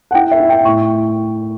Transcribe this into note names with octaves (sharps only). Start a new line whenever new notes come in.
F#5
E4 G5
E5
E4
G5
A2 C#6